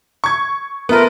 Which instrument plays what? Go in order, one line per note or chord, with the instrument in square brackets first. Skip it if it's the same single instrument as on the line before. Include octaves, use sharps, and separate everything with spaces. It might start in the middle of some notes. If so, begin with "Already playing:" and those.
[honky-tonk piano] C#6 G#6
[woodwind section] A3 F4 A#4 [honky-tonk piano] B3 B4